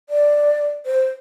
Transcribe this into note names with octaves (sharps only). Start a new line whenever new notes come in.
D5
C5